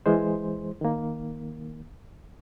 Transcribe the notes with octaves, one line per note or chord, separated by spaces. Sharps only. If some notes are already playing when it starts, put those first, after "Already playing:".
E3 G#3 C5
D#3 A#3